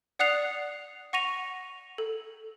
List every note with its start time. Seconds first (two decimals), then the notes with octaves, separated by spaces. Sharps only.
0.19 D5 F#5 D#6 F#6 C7 F7
1.13 F#5 C#6 A#6 D#7 F7
1.98 A4